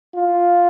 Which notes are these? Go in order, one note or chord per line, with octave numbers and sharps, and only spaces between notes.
F4